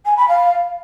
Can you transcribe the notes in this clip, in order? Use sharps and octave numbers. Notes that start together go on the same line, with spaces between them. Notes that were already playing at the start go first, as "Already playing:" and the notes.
G#5
B5
F5